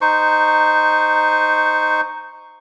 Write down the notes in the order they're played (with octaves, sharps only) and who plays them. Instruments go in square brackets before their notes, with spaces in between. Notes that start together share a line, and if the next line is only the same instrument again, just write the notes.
[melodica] D#4 C5 C#6